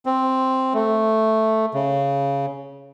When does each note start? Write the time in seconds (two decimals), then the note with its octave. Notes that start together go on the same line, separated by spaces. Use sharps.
0.06 C4
0.74 A3
1.74 C#3